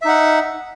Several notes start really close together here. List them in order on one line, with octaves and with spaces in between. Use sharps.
E5 D#4 F#5